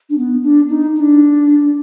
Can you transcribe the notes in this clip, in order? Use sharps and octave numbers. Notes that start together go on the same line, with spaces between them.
D4
B3
D4
D#4
D#4
D4